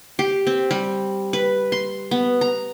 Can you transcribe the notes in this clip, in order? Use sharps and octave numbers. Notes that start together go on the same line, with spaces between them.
G4
C4
G3
B4
C6
B3
A#5